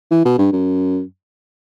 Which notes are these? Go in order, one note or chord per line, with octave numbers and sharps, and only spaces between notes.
E3
B2
G2
F#2